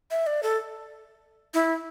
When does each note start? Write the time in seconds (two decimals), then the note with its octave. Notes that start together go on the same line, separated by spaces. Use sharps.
0.11 E5
0.27 D5
0.43 A4
1.54 E4